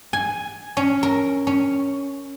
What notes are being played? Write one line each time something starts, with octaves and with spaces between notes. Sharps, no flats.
G#5
C#4
A#4
C#4